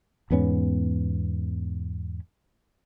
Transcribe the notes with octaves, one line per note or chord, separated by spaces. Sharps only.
E2 G#2 B3 C#4